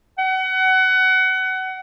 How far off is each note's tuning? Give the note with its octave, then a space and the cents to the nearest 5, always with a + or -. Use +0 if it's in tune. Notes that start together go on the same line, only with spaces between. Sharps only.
F#5 +25